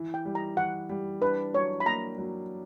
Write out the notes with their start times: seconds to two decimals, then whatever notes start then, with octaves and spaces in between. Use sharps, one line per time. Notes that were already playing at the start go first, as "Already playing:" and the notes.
Already playing: E3
0.14 G5
0.25 G3
0.35 A#5
0.57 E3 F#5
0.89 G3
1.22 D4 B4
1.54 F#3 C#5
1.80 B5
1.86 A#3 A#5
2.18 F#3